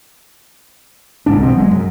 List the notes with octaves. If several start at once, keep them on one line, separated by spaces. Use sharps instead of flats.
G1 C2 G#2 D4
A1 B2 C4
F1 F#3 G#3
F#2